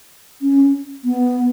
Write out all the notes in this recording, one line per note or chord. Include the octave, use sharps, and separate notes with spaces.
C#4
B3